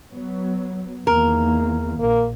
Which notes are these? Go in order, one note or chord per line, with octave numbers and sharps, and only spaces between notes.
F#3 B3
E2 D#3 A#3 A#4
A#1 A#3